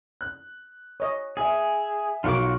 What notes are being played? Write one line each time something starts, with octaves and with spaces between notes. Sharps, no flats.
F#6
C#5 D#5
G#4 E5 G#5
B1 D#4 F4 A#4 F#5 C#6 D6